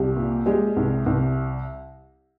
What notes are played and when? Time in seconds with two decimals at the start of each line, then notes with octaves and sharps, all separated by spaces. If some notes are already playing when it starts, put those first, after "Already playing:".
Already playing: C2 G3 G4
0.16 A#2
0.46 G3 G#3 G4
0.77 C2
1.06 C2